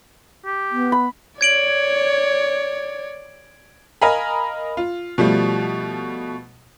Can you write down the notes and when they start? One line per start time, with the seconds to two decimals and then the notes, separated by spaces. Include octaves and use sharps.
0.45 G4
0.71 B3
0.92 B5
1.41 C#5 D5 G#6 D7 F#7
4.02 A#4 D#5 F5 G#5 A#5 B5
4.77 F4
5.18 B2 F3 G3 A3